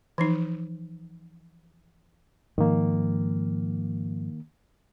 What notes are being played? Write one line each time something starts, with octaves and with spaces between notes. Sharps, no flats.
E3 F3 D#4
G#2 D#3 F3 A#3